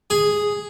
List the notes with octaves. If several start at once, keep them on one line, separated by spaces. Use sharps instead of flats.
G#4